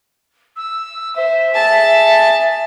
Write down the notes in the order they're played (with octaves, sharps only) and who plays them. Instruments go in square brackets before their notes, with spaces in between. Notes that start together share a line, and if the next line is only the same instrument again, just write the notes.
[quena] E6
[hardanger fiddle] C5 [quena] E5
[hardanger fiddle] G#4 A5